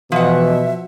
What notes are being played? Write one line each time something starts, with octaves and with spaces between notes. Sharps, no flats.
B2 E3 F3 E5 F#5